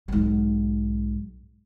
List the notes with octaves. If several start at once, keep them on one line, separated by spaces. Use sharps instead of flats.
B1 G#2